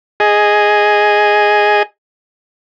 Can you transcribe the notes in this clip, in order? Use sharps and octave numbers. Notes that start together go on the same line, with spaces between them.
G#4 D#5